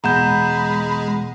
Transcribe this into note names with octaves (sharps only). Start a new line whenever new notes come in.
E1 G#3 F#5 A#5 B5 G6 E7